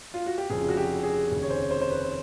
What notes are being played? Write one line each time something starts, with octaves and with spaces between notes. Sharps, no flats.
F4
F#4
G4
F1 F2 C#3 F3 G#4
F#4
G4
G#4
F1 D#2 C#3
C#5
C5
C5
C5
B4